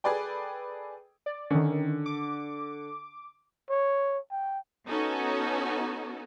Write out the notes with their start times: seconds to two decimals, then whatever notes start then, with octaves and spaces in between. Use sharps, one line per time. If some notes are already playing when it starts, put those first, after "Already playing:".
0.04 G#4 A4 B4 D5 G5
1.26 D5
1.50 D3 D#3 C#4
2.06 D6
3.70 C#5
4.31 G5
4.87 B3 C#4 D#4 F#4 A4